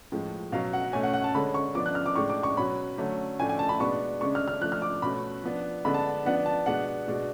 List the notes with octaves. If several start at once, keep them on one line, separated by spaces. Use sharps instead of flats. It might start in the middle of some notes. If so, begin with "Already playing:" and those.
A2 F3 G#3
B2 F#3 C#4 F5
F#5
B2 A3 C#4 G#5
F#5
F#5
A5
D3 G#3 C#4 B5
C#6
F3 B3 D4 D6
F#6
F6
D6
A2 G#3 D4 C#6
D6
C#6
B2 F#3 C#4 B5
D3 F#3 A3 C#4
A2 F3 A3 D4 G#5
G#5
A5
B5
B2 G#3 B3 D4 C#6
C#3 G#3 D4 C#6
F6
F6
F3 A3 D4 F#6
F6
D6
B2 A3 C#4 B5
F3 B3 D4
D3 G#3 B3 D4 B5
A5
F3 B3 D4 F#5
A5
B2 G#3 B3 D4 F#5
B2 G#3 D4